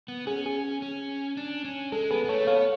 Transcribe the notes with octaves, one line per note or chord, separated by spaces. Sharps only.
B3
C#4 G#4
G#4
C#4
D4
C#4
G#3 A4
B3 G#4 B4
B3
A3 A4 C#5
B3 C#5 F5